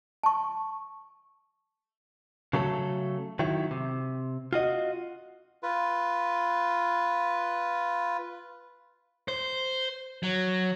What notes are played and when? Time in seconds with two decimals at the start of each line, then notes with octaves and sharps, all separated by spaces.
0.23 A5 C#6
2.53 C#3 F#3 A3 A4
3.39 D#3 F#3 E4
3.71 C3
4.53 F4 F#4 D#5
5.63 F4 B4
9.28 C5
10.23 F#3